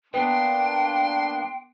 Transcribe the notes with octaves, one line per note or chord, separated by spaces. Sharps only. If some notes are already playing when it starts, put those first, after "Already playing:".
A#3 B3 D4 G5 C6